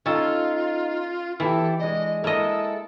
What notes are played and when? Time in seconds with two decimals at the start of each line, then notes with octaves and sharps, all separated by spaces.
0.06 C#4 D#4 F4 A4
1.40 E3 E4 G4 A4
1.79 G#3 D4 D#5
2.24 G#3 A#3 E4 A4 D#5